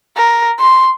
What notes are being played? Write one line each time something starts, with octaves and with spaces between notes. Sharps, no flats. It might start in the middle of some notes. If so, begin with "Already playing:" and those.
A#4
C6